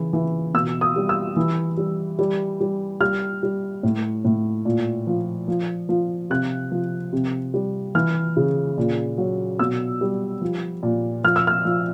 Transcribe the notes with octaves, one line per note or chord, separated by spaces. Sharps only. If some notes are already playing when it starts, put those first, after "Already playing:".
Already playing: C#3 E3
E3
B2 E6
D#6
G3
E6
E3
G3
G3
G3
G3 F6
G3
A2
A2
A#2
F3
F3
F3
C3 F#6
F3
C3
G3
E3 F6
C#3
A#2
F#3
B2 E6
G3
F3
A#2
F3 F6
E6
F6
F3